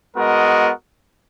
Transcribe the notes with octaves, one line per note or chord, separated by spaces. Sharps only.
G#3 B3 F#4 A#4 D#5